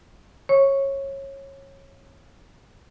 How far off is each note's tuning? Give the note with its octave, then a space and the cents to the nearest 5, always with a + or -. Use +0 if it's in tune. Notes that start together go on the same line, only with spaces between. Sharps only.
C#5 -20 C#6 +0